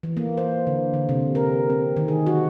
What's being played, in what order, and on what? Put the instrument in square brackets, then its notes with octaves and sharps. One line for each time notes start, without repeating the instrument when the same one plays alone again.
[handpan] E3
A#3
C5
D3
D3
C3
A#4
C4
D#3
G#4
F#4